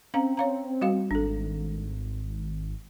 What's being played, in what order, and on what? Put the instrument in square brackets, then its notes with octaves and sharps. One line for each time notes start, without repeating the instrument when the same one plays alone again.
[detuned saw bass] C4 [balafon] C#4 F5 A#5
[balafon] C#5 F5 A#5
G3 F#4 F5
[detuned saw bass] G#1 [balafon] D4 A4